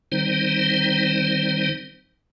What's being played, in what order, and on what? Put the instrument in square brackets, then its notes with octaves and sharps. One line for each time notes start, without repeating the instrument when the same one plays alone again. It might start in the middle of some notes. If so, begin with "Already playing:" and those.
[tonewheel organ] D#3 G3 C4 D#4 C5